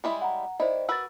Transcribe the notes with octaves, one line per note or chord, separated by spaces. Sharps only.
G3 G#3 E4
F#5 A#5
D#3 E4 C5 D5 D#5
F#4 A#4 B4 E6 A6